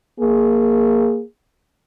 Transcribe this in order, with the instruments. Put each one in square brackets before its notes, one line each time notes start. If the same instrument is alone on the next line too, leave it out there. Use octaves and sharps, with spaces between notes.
[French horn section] A#3 G#4